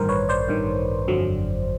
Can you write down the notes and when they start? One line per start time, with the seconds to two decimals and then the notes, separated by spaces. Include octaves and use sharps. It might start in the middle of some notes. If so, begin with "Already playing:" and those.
Already playing: A1 G2 D#3 A#4 C5
0.09 B4 C#5
0.29 C5 D5
0.48 A1 G2 D#3
1.08 G1 F2 D3 F#3